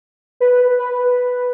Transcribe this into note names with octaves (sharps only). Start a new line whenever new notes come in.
B4
B4